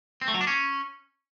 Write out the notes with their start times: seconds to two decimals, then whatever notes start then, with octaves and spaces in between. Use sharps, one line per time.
0.21 C4
0.28 A3
0.34 F#3
0.41 D4
0.47 C#4